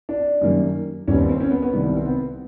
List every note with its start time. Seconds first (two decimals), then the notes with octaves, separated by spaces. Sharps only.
0.09 D4
0.41 F#2 D#3 G3 A#3
1.08 D#2 D#3 G3 B3 C#4
1.18 C4
1.29 C4
1.40 C#4
1.51 B3
1.62 B3
1.73 C2 C3 D#3 G3
1.83 B3
1.97 C4
2.05 B3